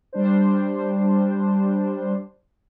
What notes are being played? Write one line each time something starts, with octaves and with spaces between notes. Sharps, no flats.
G3 D4 C5